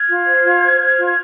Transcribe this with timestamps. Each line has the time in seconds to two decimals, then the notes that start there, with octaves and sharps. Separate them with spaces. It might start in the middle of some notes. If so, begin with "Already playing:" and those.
Already playing: F6 G#6
0.08 F4
0.26 C5
0.44 F4
0.63 C5
0.80 C5
0.98 F4